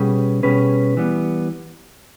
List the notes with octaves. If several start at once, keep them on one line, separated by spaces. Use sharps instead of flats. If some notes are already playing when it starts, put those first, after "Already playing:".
Already playing: B2 G3 C#4 G#4 B4
B2 G3 C#4 G#4 B4
E3 G3 B3